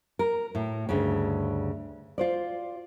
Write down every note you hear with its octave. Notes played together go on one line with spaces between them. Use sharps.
A#4
A2
D2 G2 C#3
F4 C5 D5